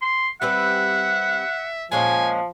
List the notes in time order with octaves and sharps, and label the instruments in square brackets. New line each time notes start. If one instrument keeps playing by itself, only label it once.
[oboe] C6
[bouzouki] G3 C4 B4 [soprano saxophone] E5 [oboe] F#5
[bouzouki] A#2 G#3 C#4 [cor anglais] F3 [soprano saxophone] G#5